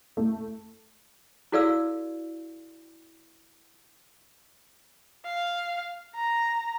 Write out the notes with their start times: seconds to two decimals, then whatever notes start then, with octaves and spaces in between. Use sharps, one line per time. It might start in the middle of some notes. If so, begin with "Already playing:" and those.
0.17 A3
1.52 E4 F#4 A4 D5 F5 E6
5.26 F5
6.16 A#5